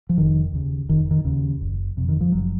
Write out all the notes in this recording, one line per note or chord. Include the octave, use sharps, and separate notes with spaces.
F3
F1 D#3
D#2 C#3
F1 D#3
D#3
D#2 C#3
F#1
F2 C3
D#3
F3
F#1 F#3